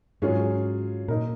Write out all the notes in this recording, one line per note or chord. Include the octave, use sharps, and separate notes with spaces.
G#2 F#3 C#4 F4 G#4 C#5
A#2 A#3 D#4 A#4